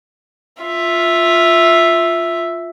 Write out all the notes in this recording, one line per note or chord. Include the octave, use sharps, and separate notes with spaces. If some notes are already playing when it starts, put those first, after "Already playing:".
F4 E5